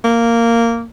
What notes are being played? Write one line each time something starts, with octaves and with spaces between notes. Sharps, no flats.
A#3